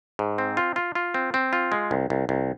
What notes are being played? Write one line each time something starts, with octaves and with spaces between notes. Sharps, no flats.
G#2
C4
F4
F4
F4
C4
C4
F4
G#3
C2
C2
C2